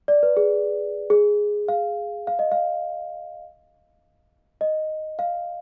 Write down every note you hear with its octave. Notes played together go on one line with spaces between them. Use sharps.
D5
B4
G#4
G#4
F5
F5
D#5
F5
D#5
F5